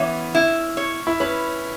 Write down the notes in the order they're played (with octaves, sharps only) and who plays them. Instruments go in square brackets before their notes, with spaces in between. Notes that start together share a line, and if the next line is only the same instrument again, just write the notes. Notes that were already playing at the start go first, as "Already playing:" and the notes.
Already playing: [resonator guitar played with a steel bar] E3 [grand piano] B3 C#4
[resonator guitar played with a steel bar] E4
C#5
[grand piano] E4
[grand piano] C#4 [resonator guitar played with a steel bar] B4